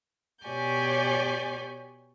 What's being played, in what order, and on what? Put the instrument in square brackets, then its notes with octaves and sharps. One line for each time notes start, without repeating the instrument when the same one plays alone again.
[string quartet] B2 G4 C#5 D5 G#5 G6